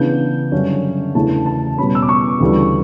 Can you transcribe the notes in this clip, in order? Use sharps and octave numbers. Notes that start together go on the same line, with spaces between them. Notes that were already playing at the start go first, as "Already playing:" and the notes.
Already playing: C#3 E3 B3 D4 G6
F#2 D3 G3 C#4
E2 C#3 E3 A3 D4 A5
A5
B2 G3 C#4 B5
E6
D6
C#6
D2 C#3 E3 G3